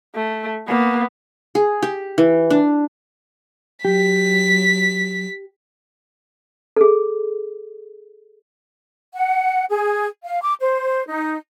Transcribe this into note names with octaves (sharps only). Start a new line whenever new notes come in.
A3
A#3 B3
G#4
G4
E3
D4
F#3 G4 B6
G#4 A4
F#5
G#4
F5
D6
C5
D#4